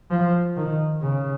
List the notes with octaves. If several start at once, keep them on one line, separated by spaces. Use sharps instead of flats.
F3
D#3
C#3